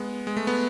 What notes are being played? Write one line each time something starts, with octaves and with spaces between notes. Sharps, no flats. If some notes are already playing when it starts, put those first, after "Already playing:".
Already playing: G#3 B3
G#3
A3
B3